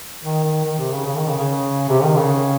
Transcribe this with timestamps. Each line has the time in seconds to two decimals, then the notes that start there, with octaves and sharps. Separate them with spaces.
0.24 D#3
0.44 D#3
0.65 D#3
0.79 C3
0.92 C#3
1.07 C#3
1.17 D#3
1.28 C#3
1.38 C#3
1.89 C3
2.03 D#3
2.17 C#3